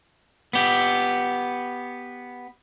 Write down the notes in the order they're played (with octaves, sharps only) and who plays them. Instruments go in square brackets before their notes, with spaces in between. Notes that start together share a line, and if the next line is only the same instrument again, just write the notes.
[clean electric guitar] B3 G4